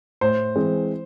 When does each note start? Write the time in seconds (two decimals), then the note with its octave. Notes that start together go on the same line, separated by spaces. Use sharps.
0.21 A2 C5
0.56 E3 G#3 C4